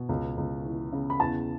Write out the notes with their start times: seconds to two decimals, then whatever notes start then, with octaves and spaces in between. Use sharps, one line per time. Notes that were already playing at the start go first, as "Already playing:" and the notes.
Already playing: B2
0.09 C#2
0.37 C#2
0.65 E3
0.92 C#3
1.10 B5
1.20 E2 A5